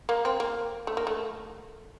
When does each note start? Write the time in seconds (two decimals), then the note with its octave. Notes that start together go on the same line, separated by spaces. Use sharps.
0.09 A#3
0.25 C4
0.40 A#3
0.87 A3
0.97 A#3
1.07 A3